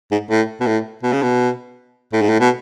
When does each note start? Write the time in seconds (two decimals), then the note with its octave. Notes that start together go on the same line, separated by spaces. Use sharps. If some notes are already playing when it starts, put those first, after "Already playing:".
0.12 G#2
0.30 A2
0.61 B2
0.67 A2
1.03 B2
1.13 C#3
1.22 B2
2.13 A2
2.21 G#2
2.29 A2
2.40 B2